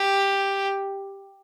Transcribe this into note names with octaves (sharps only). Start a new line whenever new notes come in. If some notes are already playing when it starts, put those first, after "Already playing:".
Already playing: G4